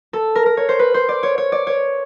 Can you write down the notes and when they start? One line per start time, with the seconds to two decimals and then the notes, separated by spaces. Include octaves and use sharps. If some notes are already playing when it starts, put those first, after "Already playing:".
0.13 A4
0.35 A#4
0.46 A#4
0.57 C#5
0.69 C5
0.79 B4
0.94 C5
1.09 D5
1.23 C#5
1.38 C#5
1.52 D5
1.67 C#5